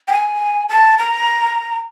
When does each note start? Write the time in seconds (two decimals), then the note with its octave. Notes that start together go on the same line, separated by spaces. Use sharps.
0.08 G5
0.12 G#5
0.69 A5
0.98 A#5